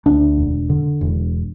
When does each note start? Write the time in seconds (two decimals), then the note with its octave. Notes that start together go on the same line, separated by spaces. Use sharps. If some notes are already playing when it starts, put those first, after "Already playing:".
0.06 D2 D4
0.38 E1
0.70 D3
1.01 E1